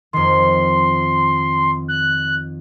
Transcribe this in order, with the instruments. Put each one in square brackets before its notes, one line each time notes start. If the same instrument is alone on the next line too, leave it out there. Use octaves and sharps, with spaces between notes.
[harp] F2 D#3 [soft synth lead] C6
[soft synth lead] F#6